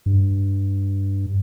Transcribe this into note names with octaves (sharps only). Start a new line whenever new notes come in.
G2